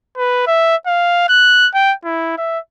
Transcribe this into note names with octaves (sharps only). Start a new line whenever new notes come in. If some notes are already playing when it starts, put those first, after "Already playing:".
B4
E5
F5
F#6
G5
E4
E5